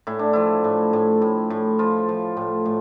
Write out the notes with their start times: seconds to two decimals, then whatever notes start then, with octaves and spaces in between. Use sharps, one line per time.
0.07 A2 E4
0.19 D4
0.33 F3 E4
0.64 A2
0.93 A2
1.22 A2
1.50 A2
1.79 F3 F4
2.09 F3
2.37 A2
2.65 A2